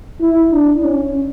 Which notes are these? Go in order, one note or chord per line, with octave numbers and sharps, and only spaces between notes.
E4
D4
C#4